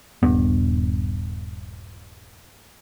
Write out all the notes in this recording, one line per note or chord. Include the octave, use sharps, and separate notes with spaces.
D#1 G2 B3